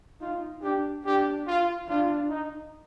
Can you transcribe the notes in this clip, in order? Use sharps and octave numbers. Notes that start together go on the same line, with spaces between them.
D#4 F4
D4 G4
D4 G4
F4
D4 F4
D#4